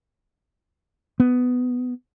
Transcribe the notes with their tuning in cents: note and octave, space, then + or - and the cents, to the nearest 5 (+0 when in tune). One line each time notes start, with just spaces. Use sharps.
B3 +10